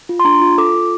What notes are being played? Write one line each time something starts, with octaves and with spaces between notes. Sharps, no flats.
F4
C6
D4 A#5
F4
A4 D6
F4